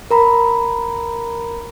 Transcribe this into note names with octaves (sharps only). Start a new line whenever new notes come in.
A#4 A#5 B5